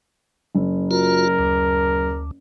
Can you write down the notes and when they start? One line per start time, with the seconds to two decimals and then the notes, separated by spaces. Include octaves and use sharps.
0.55 F#1
0.91 F4 F#4 A#4
1.39 D2